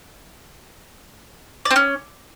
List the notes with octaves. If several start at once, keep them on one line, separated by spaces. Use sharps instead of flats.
D5
C4
C#4